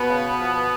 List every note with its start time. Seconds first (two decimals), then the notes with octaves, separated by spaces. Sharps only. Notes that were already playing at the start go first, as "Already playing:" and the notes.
Already playing: B2 B3
0.09 C#3
0.38 F3